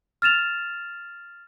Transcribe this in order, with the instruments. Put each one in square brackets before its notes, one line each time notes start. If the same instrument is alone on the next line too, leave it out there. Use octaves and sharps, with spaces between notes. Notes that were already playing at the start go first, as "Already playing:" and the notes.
[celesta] F6 A6 E7 F7